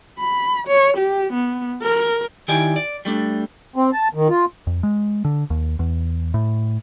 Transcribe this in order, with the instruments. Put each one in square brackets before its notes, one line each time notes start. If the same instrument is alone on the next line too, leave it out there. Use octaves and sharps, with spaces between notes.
[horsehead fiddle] B5
C#5
G4
B3
A#4
[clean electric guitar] D#3 E4 G4 D5 G#5
D5
G3 A3 D4
[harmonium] C4
A5
D#3
F4
[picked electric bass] F2
G#3
D3
D#2
E2
A2